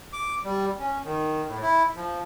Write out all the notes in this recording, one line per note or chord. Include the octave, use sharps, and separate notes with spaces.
D6
G3
C#4
D#3
A2
E4
F3